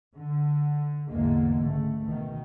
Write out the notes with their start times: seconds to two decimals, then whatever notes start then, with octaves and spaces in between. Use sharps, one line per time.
0.15 D3
1.10 A1 E2 G#2 D3 G#3 A#3
1.67 C#2 A3
2.08 B2 D#3